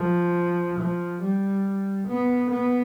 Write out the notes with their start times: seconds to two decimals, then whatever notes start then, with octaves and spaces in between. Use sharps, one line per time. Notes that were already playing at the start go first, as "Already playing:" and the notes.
Already playing: F3
0.80 F3
1.22 G3
2.08 B3
2.51 B3